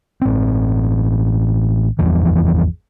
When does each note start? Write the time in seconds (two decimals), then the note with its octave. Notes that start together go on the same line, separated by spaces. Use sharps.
0.21 A1 C4
1.99 G#1 E2 E3 F3